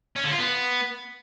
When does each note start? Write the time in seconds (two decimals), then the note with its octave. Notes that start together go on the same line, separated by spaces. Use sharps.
0.16 C#4
0.23 D3
0.31 F4
0.38 B3